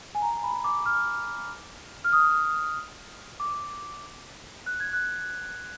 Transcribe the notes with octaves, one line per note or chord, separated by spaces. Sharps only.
G#5
A#5
B5
D6
F6
F6
D#6
D6
F#6
G#6
F#6